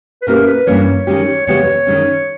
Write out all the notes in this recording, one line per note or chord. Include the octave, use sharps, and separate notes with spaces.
B4
B2 A#3 C#4 E4 G4 A#4
B4
G2 E3 A#3 C#4 C#5
D#3 G#3 C#4 G4
E2 C#3 G#3 B3 G4 C#5
D#3 G#3 C#4